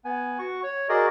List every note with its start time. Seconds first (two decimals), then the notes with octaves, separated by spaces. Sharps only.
0.05 B3 G#5
0.39 F#4 C#6
0.63 C#5
0.89 F#4 G#4 A#4 D5 D#5